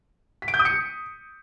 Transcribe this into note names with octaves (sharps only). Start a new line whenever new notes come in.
B6
D7
G6
D#6
C#7